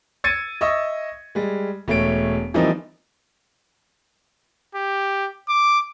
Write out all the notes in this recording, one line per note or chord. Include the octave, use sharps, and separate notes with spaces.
E6 G#6 A6 C#7 D#7
D#5 E5 C#6 D#6 E6
G3 G#3
E1 A3 C#5 D7
E3 F3 G3 A#3 C4 D#4
G4
D6